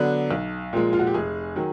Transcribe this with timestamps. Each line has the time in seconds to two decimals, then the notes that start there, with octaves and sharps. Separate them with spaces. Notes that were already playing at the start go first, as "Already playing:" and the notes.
Already playing: D3 F#3 B3 D4
0.31 B1
0.73 A#2 F3 G#3
0.93 F4
0.99 F#4
1.07 G4
1.14 F1 G#4
1.56 D#3 F#3